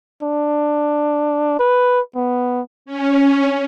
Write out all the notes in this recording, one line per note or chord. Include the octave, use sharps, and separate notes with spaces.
D4
B4
B3
C#4